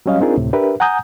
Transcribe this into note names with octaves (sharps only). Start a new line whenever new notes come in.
F#3 G3 C#4 D#5 F5
C4 D4 D#4 F4 G#4 A#4
D2 A2 C3
D4 G4 A#4 B4 E5
F#5 G#5 A#5 D#6 G6